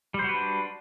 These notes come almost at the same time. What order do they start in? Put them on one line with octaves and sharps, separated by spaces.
G3 C5 F#4 B4 D4